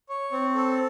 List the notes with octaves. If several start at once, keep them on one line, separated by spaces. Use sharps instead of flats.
C#5
C4
A4